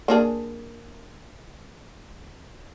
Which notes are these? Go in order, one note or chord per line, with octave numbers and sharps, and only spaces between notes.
A#3 D4 G#4